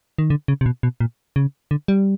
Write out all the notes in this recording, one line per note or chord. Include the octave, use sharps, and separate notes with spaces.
D#3
D3
C#3
C3
B2
B2
A#2
C#3
D3
G3